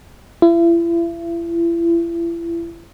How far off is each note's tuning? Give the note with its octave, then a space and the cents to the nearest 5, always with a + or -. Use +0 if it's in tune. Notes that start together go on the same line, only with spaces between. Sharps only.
E4 +40